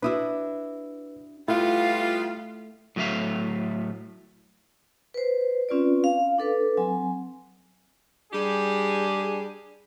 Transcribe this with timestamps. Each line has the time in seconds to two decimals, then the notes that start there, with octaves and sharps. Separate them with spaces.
0.02 D4 E4 F#4 B4 D#6 E6
1.48 G3 A3 B3 E4 F4
2.96 A2 F#3 A3 E5 F5
5.14 B4 C5
5.69 C4 C#4 F4 B4 D5
6.04 F5
6.38 D4 A4 B4
6.77 F#3 C4 G#5
8.32 G3 D4 G4 G#4